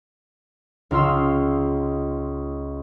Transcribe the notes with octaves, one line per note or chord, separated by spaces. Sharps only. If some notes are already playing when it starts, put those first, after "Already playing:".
C#2 D#4 F4 C6 E6